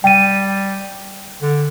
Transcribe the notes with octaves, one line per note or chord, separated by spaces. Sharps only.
G3 G5 D#7
D3